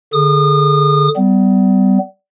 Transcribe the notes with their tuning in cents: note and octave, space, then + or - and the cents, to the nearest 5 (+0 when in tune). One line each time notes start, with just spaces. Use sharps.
D3 +0 G#4 +0 D#6 -35
G3 -20 B3 +35